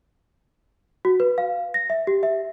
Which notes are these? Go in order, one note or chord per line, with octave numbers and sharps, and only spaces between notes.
F#4
B4
F5
A#6
E5
G4
E5